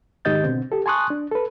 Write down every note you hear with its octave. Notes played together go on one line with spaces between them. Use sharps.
G#2 D#3 G4 D#5 G6 A6
B2 D3 C4
G4 A4
G#5 A5 C6 C#6 D#6 F#6
D4
A4 B4